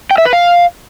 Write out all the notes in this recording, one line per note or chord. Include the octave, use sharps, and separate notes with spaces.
G5
E5
B4
F5